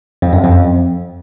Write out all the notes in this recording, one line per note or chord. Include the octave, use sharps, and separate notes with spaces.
F2
F#2
F2